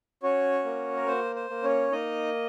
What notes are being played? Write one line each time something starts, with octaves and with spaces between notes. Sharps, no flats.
C#4 F#4 C#5
A#3
A#4
A#3 C5
C5
A#3
C#4 C#5
A#3 D#4 D#5